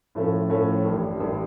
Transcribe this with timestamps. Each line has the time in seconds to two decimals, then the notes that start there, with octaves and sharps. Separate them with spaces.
0.15 A2 F3 A3 C#4
0.50 A2 F3 A3 C#4
0.85 A1 G2 E3
1.20 A1 G2 E3